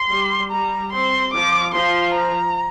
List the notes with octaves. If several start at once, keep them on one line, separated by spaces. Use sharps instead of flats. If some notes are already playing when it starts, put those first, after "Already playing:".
Already playing: C6
G3
G3 A#5
C4 C6
F3 D6
F3 C6
A#5